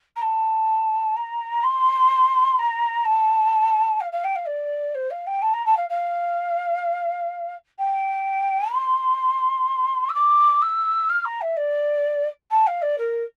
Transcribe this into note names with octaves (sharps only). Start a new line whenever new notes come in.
A#5
A5
A#5
C6
A#5
A5
F5
F5
G5
F5
D5
C5
F5
G5
A5
A#5
A5
F5
F5
G5
C6
E6
D6
E6
F6
A#5
E5
D5
A5
F5
D5
A#4